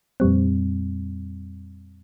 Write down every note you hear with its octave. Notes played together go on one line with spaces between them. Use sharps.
F2 A#2 G3 C4